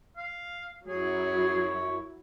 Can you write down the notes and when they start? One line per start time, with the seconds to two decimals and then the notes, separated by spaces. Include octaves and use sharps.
0.17 F5
0.88 F#2 F#3 E4 G#4 C#5